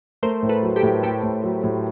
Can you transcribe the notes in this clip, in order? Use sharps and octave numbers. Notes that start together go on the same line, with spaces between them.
A3 A#4 C5
A2
A4 B4
F#3
G4 A4
A2
A3 G4 A4
A2
F#3
A2